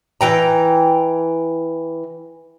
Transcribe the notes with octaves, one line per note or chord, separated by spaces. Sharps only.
E3 G5 A#5